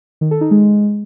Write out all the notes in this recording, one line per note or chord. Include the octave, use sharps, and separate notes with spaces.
D#3
A4
D#4
G#3